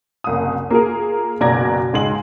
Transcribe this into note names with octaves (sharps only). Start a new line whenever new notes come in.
F#1 C2 D#6
A#3 F4 G#4 A#4
F#1 B2 D5 A#5 G#6 A#6
C#2 G#2 G#3 C6 F#7